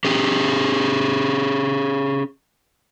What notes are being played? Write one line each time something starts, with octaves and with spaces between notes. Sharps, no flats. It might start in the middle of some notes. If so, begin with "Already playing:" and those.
C#4 G4 G#4